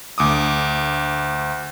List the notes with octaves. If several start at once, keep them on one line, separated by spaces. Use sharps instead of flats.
D2 D6 D#6